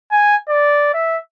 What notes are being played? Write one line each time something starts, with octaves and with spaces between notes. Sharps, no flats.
G#5
D5
E5